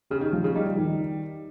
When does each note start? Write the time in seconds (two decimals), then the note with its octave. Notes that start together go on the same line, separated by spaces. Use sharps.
0.10 C#3 G4
0.21 D#3
0.32 D#3 F3
0.44 C#3
0.55 G3 D#4
0.77 D#3